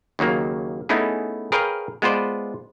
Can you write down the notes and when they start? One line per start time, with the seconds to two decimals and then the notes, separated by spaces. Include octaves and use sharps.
0.19 D#2 C#3 F#3 A#3
0.89 A3 B3 C#4 D#4 E4 G#4
1.52 G#4 A#4 B4 C#5 F5 G5
2.02 G#3 B3 F4 B4 C5 D5